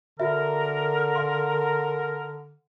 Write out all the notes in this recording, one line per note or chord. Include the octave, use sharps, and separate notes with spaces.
D3 F#4 A#4 E5
F5 C6